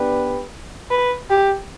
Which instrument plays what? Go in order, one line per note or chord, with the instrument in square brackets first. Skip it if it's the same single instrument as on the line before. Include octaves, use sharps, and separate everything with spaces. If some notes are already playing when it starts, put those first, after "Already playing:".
Already playing: [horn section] B3 D4 G4 B4
[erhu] B4
G4